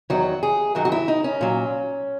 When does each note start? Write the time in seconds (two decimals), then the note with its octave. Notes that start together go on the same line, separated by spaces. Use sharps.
0.10 E2 D#3 F#3 F#4
0.43 G#4
0.75 F#2 D#3 F#3 F#4
0.85 F#4
0.92 E4
1.08 D#4
1.24 C#4
1.41 A#2 F#3